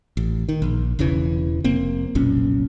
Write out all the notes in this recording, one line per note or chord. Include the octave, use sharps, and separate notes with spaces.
A1
D#3
A#1
E1 E2 C#3 E3
F1 A#3 C4
F1 B1 A#2 C#4